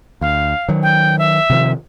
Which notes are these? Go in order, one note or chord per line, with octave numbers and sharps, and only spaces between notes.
D2 F5
D#3 F#3
G5
E5
C3 D#3 F3